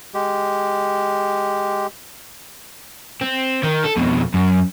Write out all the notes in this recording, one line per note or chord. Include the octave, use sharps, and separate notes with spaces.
G#3 G4
C4
D#3
A4
F2 B2
F#2